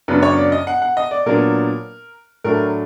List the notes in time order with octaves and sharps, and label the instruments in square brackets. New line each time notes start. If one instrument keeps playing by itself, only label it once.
[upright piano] F#2 C#3 F#3 B3 D4 B4
C#5
D5
D#5
F#5
F#5
D#5
D5
A#2 F#3 B3 D4 A#4
A2 F#3 A3 D4 A#4